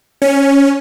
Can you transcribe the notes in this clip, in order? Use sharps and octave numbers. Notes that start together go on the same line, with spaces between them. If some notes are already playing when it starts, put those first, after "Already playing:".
C#4